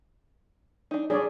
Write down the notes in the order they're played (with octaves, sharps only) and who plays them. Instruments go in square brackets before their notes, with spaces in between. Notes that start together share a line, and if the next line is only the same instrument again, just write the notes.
[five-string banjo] D4 D#4
[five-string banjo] G3 D4 [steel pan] G#4 C#5 D5